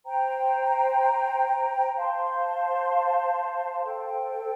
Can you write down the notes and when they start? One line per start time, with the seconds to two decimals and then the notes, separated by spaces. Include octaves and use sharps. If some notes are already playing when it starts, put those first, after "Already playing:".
0.05 C5 G5 A#5
1.94 C5 F5 A5 C6
3.84 A4 C5 G5